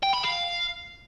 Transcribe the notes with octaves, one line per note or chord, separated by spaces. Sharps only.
G5
B5
F5